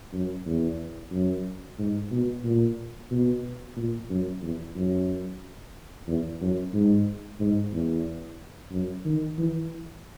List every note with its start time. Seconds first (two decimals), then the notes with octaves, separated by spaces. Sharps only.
0.13 F#2
0.46 E2
1.12 F#2
1.79 G#2
2.11 B2
2.44 A#2
3.11 B2
3.77 A#2
4.10 F#2
4.42 E2
4.76 F#2
6.08 E2
6.41 F#2
6.74 G#2
7.40 G#2
7.72 E2
8.72 F#2
9.05 D#3
9.38 E3